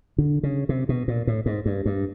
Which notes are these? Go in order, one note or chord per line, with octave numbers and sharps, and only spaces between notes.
D3
C#3
C3
B2
A#2
A2
G#2
G2
G2